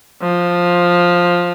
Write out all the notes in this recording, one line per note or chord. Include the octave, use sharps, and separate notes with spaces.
F3